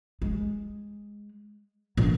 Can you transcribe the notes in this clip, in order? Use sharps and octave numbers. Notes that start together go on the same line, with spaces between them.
G#3
A#2 D3